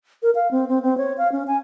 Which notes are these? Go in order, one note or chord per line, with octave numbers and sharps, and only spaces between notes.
A#4
F5
C4
C4
C4
C#5
F5
C#4
G#5